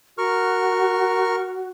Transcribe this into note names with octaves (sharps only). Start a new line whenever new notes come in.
F#4 A#4 C#6 F6